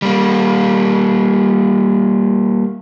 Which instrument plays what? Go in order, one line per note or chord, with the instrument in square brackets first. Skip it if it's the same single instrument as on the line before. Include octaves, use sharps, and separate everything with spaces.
[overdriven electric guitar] G3 A#3